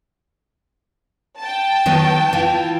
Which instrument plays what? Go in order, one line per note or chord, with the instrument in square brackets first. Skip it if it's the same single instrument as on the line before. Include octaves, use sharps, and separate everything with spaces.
[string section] G5 A5
[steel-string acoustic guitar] D#3 F#3 B3
E3 F4